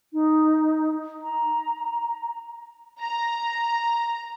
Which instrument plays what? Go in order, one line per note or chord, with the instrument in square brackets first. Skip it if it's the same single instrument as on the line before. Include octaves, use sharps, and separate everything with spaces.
[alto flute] D#4
A#5
[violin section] A#5